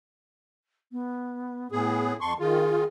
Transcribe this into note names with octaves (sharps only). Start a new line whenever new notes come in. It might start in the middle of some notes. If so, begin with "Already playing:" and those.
B3
A2 B3 G#4
F2 A5 C6 C#6
D#3 F4 G#4